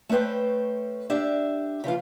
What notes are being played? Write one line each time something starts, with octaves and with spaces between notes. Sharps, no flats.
A3 C#4 B4 C5 G5
D4 G4 E5
C#3 E3 F3 F4